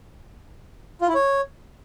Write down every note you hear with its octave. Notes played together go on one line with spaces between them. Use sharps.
F4
E4
C#5